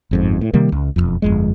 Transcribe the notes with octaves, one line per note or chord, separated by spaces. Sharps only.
G1 F2 G#2
A2
C3 D#3 G3 A#3
C#2
E1 A#1 F2
G1 F2 G#3